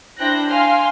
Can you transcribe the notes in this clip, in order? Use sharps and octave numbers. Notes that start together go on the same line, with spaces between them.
D4 E4 C5 G5 F#6 A#6
F5 G5 G#5 C6 F6